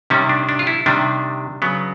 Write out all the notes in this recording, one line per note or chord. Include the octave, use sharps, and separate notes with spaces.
C3 D#3 G3 C#4
D4
D4
F4
E4
C3 D#3 G3 D4
C#3 F#3 B3